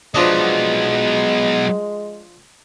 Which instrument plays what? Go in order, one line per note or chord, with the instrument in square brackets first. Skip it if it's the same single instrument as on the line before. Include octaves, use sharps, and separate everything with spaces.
[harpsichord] F3 D4 D#5 [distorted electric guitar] F#3 B3 [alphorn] G#3